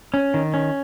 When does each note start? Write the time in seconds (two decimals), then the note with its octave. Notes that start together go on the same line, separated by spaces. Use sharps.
0.14 C#4
0.34 D#3
0.54 C#4